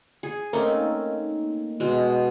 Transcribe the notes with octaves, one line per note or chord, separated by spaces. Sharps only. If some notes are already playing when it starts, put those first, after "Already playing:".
G#4
A3 A#3 C4 C#4 D#4
B2 G#3